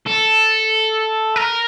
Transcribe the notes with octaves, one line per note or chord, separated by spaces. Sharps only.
A4
A#4